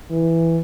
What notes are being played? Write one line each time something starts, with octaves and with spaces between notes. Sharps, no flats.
E3